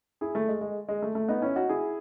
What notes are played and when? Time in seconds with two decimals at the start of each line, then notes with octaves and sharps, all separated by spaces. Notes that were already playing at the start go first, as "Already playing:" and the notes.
0.21 E4 G#4
0.35 A3
0.48 G#3
0.61 G#3
0.88 G#3
1.02 A3
1.15 A3
1.28 B3 D#4
1.42 C#4 E4
1.55 D#4 F#4
1.69 E4 G#4